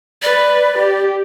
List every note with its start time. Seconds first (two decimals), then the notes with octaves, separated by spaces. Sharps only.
0.22 B4 D5
0.78 G4